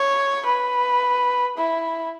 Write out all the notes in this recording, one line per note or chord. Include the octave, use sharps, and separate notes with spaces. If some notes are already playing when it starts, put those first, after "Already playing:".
Already playing: C#5
B4
E4